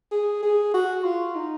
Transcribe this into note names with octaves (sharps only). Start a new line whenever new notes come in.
G#4
G#4
F#4
F4
D#4